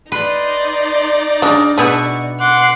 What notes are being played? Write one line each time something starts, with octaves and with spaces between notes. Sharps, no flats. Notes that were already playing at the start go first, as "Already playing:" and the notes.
D#4 B4 D5 C6
C#3 D4 A#4
B2 B3 G#4 A4 B4 E5 C#6
F#5 C6 D6 F#6 C7